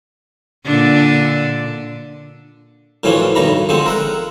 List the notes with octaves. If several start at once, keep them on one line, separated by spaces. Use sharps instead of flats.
A#2 D3 D4
F#2 A2 E3 F3 C#4 D4
B1 G2 D#3 A#5 B5
D3 F3 G#3 C4
A#4 E5 F#5